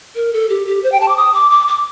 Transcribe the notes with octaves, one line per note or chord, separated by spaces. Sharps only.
A#4
A4
G4
G4
C5
G5
A5
D6
D#6
D6
D6
D6